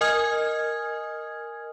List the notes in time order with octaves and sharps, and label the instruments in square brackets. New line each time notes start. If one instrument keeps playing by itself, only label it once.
[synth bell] A#4 D#5 G#5 D#6 F6 G#6